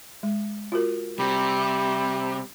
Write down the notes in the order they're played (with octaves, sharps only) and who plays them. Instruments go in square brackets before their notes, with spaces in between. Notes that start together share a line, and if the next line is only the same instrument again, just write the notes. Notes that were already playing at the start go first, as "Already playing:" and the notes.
[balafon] G#3
F4 F#4 A#4
[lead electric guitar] C3 [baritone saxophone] G3